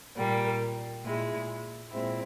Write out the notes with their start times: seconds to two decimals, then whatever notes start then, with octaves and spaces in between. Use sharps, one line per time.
0.17 A#2 G3 A#3
1.04 A#2 G#3 E4
1.91 A#2 G#3 C4 E4